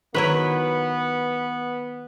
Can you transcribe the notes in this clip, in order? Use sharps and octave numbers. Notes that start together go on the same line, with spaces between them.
D#3 F#3 B3 E4 B4